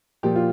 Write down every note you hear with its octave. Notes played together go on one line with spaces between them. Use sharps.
A#2 F3 G4
F4